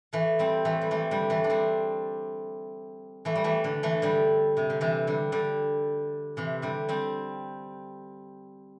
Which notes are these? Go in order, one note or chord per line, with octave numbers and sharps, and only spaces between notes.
E3 A3
G3 C4
E3 A3
G3
E3 A3
D3 G3
E3 A3
D4
G3 C4
E3 A3
G3
E3 A3
D3
E3 A3
D3 G3
C3
D3
C3 E3
D3 G3
D3 G3
C3 E3
D3 G3
G3 C4